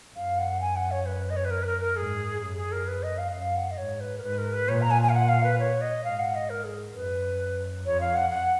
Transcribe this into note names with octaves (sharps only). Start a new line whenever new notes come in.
F#2 F5
F#5
G#5
F#5
C#5
B4
D#5
C#5
B4
A#4
B4
A#4
A#4
G#2 G#4
F#2 G#4
G#4
A#4
B4
D#5
F5
F#2 F5
F#5
D#5
G#2 C#5
B4
A#4
G#2 B4
A#4
B4
A#2 C#5
A#5
G#5
G#5
F5
F#5
F5
B4
C#5
D#5
G#2 F5
F#5
D#5
A#4
G#4
F#2 B4
F2 C#5
F5
F#5
F#5